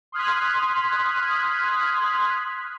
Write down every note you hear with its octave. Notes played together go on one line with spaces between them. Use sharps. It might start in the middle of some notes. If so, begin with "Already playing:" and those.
C6 D#6 F6 F#6 G#6 B6